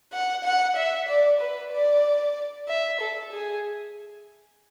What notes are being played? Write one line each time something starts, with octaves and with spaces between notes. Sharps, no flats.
F#5
F#5
E5
D5
B4
D5
E5
A4
G#4